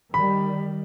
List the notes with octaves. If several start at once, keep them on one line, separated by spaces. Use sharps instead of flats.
D#3 G3 B5